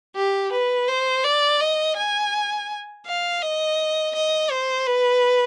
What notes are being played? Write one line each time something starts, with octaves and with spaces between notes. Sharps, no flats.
G4
B4
C5
D5
D#5
G#5
F5
D#5
D#5
C5
B4